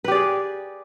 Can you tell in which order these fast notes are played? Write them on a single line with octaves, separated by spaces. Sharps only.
B4 G4 D5 G#4